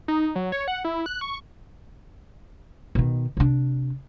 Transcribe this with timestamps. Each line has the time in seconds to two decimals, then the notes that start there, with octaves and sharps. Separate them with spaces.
0.08 D#4
0.35 F#3
0.52 C#5
0.68 F#5
0.85 E4
1.06 F#6
1.21 C#6
2.95 B2 D#3
3.37 C3 D4